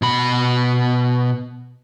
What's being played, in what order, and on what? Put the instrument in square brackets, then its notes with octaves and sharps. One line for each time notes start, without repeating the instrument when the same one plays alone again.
[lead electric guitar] B2 B5